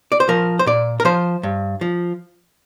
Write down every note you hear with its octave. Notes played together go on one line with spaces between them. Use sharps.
D5
C5
F3 A#4
C5
A#2 D5
A#4
F3 C5
G2
F3